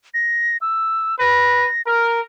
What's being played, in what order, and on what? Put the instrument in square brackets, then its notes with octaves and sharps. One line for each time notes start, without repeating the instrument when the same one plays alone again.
[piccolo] A#6
E6
[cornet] B4 [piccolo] A#6
[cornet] A#4 [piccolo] F6